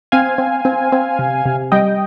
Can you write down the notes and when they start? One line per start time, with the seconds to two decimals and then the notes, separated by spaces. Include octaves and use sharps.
0.12 C4 F5 G#5
0.38 C4
0.65 C4
0.92 C4
1.19 C3
1.45 C3
1.72 G3 D#5 G5